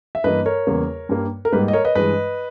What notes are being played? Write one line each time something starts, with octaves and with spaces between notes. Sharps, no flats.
E5
G2 E3 A#3 B4 D#5
A#4 C#5
E2 C#3 G3 A#3
G2 G3 A#3
A#4
G#2 G3 A#3 B4
D#5
A#4 C#5
B4 D#5
G2 E3 G#3 B4 D#5